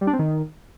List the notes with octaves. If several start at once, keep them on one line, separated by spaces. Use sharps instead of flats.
G3
D4
C4
D#3